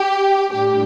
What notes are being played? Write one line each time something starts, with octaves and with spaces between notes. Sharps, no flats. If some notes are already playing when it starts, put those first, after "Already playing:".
Already playing: G4
A2 G3 D4 G4